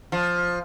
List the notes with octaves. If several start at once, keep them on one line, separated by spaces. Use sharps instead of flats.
F3